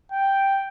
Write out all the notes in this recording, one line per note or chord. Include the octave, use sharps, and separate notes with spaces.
G5